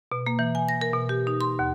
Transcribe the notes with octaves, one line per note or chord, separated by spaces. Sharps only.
B2
A#3
E3
G#5
A#6
A#4
B2
G4
D#4
C6
D#2